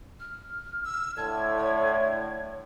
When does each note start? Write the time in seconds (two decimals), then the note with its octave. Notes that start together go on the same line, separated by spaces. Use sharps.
0.20 F6
0.85 E6
1.17 A2 D3 A5 G#6
1.56 C#5